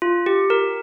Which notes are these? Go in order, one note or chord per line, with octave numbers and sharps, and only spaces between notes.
F4
G4
A#4